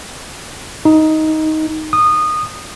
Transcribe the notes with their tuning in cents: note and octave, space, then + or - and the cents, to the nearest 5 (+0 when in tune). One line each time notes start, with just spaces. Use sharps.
D#4 +10
D#6 -20